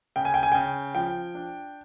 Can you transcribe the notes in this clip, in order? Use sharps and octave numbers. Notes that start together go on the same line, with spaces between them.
C#3 G5
G#5
G5
G#5
C#3 G5
F3 G5
D4